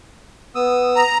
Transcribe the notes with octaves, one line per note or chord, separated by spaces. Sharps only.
B3 D#6 E6
A#5